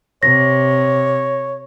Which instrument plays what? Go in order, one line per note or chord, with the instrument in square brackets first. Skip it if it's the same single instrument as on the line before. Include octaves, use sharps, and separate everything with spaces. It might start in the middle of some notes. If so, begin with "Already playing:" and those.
[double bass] C3 [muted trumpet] C#5 [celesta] A#6